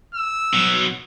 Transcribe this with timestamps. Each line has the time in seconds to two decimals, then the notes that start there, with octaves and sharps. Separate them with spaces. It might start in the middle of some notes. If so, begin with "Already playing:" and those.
0.15 E6
0.54 B2 F#3